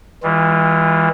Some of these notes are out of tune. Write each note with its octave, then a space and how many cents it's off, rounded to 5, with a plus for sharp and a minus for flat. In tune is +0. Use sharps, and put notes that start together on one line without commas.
E3 -20 G#3 -45 F4 +0